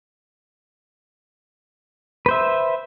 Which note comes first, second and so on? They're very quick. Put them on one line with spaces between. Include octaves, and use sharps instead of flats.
B4 C5 E5